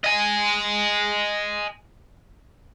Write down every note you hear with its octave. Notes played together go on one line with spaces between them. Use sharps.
D#5 G#5